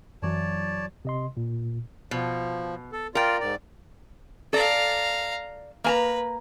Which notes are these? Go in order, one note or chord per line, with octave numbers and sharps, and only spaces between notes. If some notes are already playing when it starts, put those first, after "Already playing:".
F#2 E3 F#3 C#5 D5 A5
C3 D#5 C6
A#2
B2 F3
A4
F4 A#4 D5 G5
G#2 D5
A4 D5 F5 A#5
A#3 B4 G#5 A#5